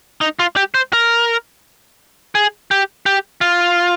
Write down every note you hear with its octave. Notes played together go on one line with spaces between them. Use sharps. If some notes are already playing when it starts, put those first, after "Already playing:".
D#4
F4
G4
C5
A#4
G#4
G4
G4
F4